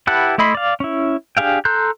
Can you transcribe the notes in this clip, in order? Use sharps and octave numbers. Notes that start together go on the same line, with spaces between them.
E4 G4 B4 F#5 A5
A3 E4 D#5 B5 C6
D5 F5
C#4 E4
D4 G4 G#4 F5 G5
A4 A#5 C6 F#6 G6